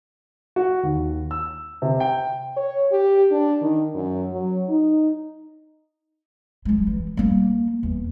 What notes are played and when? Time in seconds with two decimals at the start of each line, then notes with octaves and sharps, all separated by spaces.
0.56 F#4
0.83 D#2
1.31 E6
1.82 C3
2.00 G5
2.56 C#5
2.92 G4
3.31 D4
3.62 D#3
3.95 F#2
4.33 F#3
4.69 D#4
6.65 F#3 G#3
6.87 E3
7.17 G3 A#3
7.83 E2